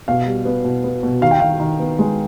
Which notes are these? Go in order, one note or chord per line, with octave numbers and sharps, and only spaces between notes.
B2 F5
G3
B3
B2
B3
B2
D#3 F5
G5
D#3 F5
D#3
B3
G#3